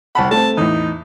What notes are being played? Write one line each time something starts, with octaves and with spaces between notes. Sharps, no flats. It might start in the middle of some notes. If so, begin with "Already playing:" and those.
C2 F#5 A5 B5
A3 C4 A5
E2 A2 D#4